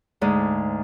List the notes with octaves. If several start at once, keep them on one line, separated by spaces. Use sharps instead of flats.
D2 G#2